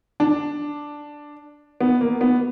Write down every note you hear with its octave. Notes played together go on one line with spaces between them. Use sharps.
D4
B3
A#3
B3